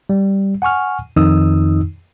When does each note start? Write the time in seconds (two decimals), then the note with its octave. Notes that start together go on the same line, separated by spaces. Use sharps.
0.09 G3
0.62 F#5 G#5 C#6 F6
1.16 F2 D#3 D#4 D#6 E6